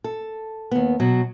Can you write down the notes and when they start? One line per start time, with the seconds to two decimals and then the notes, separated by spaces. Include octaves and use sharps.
0.04 A4
0.71 D#2 B3
1.00 B2 F#3